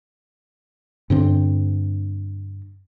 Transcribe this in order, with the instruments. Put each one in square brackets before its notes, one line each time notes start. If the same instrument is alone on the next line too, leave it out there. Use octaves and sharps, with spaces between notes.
[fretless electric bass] G2 D3 C4